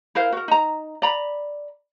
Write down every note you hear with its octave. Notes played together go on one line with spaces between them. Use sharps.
E4 A#4 C5 F5
F#4 A#4
D#4 A#5
D5 A#5 B5